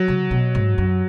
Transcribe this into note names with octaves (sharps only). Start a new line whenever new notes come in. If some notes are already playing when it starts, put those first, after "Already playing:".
Already playing: F#3
C#3
B2
G#2
F#2